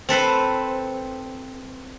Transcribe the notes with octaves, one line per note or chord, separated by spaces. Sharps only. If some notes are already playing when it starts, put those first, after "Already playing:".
C4 A4 B4 C5